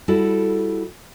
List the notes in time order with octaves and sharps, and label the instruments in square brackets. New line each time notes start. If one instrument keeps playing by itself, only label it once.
[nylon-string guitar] G3 E4 F#4 A4